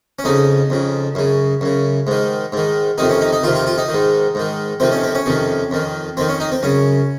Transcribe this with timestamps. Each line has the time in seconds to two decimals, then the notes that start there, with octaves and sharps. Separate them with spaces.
0.19 C#4
0.24 F2 C#3 D#4
0.70 F2 C#3
1.15 F#2 C#3
1.61 F#2 C#3
2.07 G#2 D#3
2.52 G#2 D#3
2.98 F2 C3 D#3 D#4
3.09 C#4
3.21 D#4
3.33 D#4
3.43 D#3 F4
3.46 F2 C3
3.55 F4
3.66 F4
3.78 D#4
3.89 G#2 D#3
4.35 G#2 D#3
4.80 F2 C3 D#3 C4
4.92 C#4
5.03 C4
5.15 C#4
5.26 F2 C3 D#3
5.71 F2 D#3
6.17 F2 D#3 C4
6.28 C#4
6.40 D#4
6.52 C4
6.63 F#2 C#3 C#4